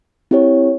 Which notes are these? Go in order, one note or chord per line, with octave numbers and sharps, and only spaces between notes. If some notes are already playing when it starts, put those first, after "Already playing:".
C4 E4 G4 C#5